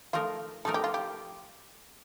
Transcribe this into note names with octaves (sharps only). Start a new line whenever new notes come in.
F3 A3 D#4 F4 A#4
F3 A3 D#4 A4 A#4
G4
F4
G4